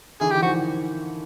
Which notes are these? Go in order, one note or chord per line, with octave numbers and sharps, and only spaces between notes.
D3 E3 G#4
E3 G4
D#3 F3 F#4